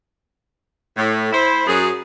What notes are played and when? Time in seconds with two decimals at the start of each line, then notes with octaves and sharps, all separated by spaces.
0.97 A2
1.33 E4 C5
1.67 F#2 G#4